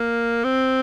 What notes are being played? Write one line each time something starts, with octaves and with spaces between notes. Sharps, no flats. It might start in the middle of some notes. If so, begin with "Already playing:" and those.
Already playing: A#3
C4